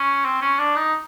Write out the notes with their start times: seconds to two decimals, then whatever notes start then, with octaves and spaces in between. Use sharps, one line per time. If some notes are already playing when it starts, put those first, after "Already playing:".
Already playing: C#4
0.25 C4
0.41 C#4
0.59 D4
0.76 D#4